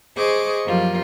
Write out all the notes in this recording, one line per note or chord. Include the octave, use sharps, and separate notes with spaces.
G#4 C5 D#5 C#6 D6
F#2 F3 G3 A#3 F4